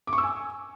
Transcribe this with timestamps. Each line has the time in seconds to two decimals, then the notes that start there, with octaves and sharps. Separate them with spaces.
0.07 D6
0.13 C#6
0.18 E6
0.23 G#5